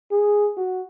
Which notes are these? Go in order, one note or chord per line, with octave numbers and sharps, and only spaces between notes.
G#4
F#4